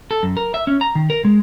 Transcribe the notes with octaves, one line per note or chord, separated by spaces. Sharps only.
A4
F#2
A#4
E5
C#4
A#5
D#3
A#4
G#3